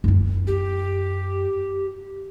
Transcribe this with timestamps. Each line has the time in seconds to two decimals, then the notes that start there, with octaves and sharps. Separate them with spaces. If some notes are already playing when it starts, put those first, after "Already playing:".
0.04 F#2 E4
0.47 G4